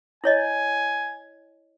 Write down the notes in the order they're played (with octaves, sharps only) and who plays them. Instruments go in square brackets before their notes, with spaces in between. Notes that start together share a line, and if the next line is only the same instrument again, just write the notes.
[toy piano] E4 C#5 D#5 [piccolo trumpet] G#5